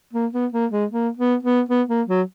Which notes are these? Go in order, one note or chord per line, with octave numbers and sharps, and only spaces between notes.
A#3
B3
A#3
G#3
A#3
B3
B3
B3
A#3
F#3